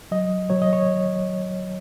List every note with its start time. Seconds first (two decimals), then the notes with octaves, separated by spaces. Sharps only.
0.11 F#3 D#5
0.50 F#3 C#5
0.62 D#5
0.73 C#5